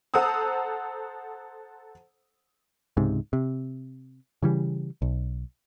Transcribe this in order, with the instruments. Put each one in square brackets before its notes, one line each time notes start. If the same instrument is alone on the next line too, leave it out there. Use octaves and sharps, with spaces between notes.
[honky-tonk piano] A4 C5 F#5 A#5 D#6 E6
[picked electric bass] C#2 G#2 C3
C3
C#3 E3 G3
B1